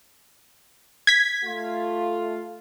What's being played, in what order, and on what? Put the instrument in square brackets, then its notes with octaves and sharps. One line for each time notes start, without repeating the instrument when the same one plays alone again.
[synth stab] G#6 B6
[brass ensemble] A3 F4